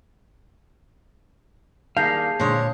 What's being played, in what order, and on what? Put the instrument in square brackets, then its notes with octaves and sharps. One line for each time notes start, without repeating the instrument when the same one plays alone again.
[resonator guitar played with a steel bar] D#3 G3 A#3 [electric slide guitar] G#4 F5 [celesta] A5 G6 C7
[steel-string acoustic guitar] A#2 C#5 [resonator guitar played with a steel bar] D3 G#3 C5